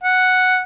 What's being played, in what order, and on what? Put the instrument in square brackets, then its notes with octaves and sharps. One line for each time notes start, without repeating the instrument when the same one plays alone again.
[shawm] F#5